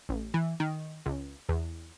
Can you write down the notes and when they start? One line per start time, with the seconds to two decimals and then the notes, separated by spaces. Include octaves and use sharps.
0.09 A1
0.34 E3
0.60 D#3
1.06 C#2
1.49 E2